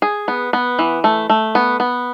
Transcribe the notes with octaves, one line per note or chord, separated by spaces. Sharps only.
G#4
B3
B3
E3
A3
A3
B3
B3